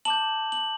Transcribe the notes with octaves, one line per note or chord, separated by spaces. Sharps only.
A5 D6 G6 F#7
F#7